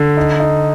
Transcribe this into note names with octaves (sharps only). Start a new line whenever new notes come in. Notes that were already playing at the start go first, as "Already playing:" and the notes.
Already playing: D3
D#4
D#4